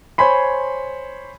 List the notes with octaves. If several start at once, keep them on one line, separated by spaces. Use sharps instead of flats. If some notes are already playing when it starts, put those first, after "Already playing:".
C5 C#5 G#5 B5 C6